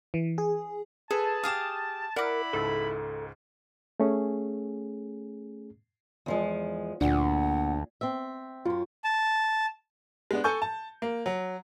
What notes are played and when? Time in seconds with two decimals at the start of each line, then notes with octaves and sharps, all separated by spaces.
0.14 E3
0.38 G#4
1.11 G#4 A4 B4 A5
1.44 G4 G#4 F5 D#6 E7
2.16 E4 A#4 D5 F#5 B5 D6
2.53 C#2 G#2 A4
4.00 A3 C#4 G#4
6.26 E2 F3 G#3
7.01 D2 A#2 D4 F#5
8.01 C4 E5
8.65 F#2 C#4 F4
9.04 A5
10.31 G#3 B3 D4
10.44 A4 G#5 C#6 G6
10.62 A5
11.02 A#3
11.26 F#3